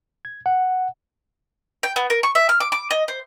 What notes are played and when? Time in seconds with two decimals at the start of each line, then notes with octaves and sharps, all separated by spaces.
0.25 G#6
0.46 F#5
1.83 G5
1.96 B3
2.10 A#4
2.23 C#6
2.35 E5
2.49 F6
2.60 D6
2.72 D6
2.91 D#5
3.08 C5